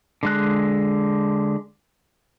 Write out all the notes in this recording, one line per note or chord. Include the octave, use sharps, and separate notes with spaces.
D3 G#3 F#6